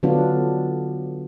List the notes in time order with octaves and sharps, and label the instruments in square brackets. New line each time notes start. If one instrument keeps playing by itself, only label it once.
[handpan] D3 F#3 B3 D4 F4